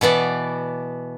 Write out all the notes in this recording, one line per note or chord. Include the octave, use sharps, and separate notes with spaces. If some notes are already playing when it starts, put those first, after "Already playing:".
B2 E3 B3 D5